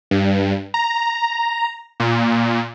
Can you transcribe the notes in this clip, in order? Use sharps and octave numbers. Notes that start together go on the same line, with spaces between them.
G2
A#5
A#2